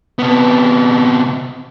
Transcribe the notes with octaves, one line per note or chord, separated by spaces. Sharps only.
C3 B3